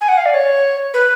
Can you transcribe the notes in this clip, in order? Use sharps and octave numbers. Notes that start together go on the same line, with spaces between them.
G#5
F#5
F5
D5
C#5
B4